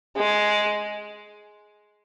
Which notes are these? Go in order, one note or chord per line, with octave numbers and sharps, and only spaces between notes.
G#3